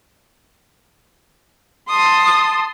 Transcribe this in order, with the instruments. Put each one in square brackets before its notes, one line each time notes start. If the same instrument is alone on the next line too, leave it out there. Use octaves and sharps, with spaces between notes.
[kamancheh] A5 C6 [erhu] D#6